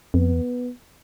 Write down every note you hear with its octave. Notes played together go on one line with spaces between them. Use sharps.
F2 B3
E2